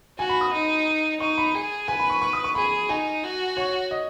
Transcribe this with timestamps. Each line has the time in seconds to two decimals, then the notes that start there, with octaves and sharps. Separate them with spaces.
0.18 F#4 G#5
0.29 B5
0.41 D#6
0.53 D#4
1.20 D#4 C#6
1.38 B5
1.54 G#4
1.88 B4 G#5
2.00 B5
2.10 C#6
2.22 C#6
2.33 D#6
2.44 C#6
2.55 G#4 B5
2.89 D#4 G#5
3.23 F#4
3.57 C#5
3.91 D#5